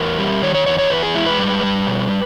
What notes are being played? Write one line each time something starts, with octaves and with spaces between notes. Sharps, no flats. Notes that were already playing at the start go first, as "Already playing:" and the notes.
Already playing: E2 A#4
G3
D#3 C#5
C#5
E2 C#5
C#5
E2 B4
G#4
G#3 E4
B4
G3
G3
B2